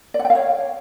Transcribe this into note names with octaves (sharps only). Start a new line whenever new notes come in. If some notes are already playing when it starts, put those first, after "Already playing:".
D5
F#5
G5
F5
C#5